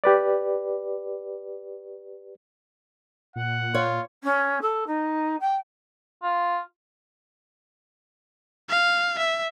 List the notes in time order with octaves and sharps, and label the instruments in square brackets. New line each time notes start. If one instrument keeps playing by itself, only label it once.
[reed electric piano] G4 B4 D5
[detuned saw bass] A#2 [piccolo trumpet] F#5
[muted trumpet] F4 [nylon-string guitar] C#5
[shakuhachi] C#4
A4
D#4
G5
[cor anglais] F4
[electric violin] F5
E5